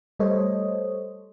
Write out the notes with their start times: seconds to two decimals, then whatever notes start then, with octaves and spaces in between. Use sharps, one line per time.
0.19 G3 A3 A4 C5 C#5 D#5